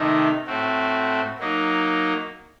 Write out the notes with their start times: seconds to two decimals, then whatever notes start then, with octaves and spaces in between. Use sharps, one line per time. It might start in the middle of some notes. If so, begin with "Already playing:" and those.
Already playing: C3 D#3 A3 D#4
0.47 A2 A3 C4 F#4
1.39 F#3 A#3 D#4